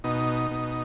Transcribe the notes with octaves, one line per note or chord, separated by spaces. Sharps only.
B2 D#4
B2